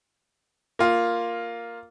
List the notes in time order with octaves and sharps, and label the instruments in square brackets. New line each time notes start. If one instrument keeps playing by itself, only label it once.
[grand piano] A#3 F4